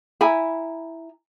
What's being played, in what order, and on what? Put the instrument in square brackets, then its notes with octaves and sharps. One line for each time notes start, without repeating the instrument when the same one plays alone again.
[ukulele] E4 G#5 A#5 B5